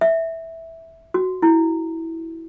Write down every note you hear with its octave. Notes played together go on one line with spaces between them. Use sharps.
E5
F#4
E4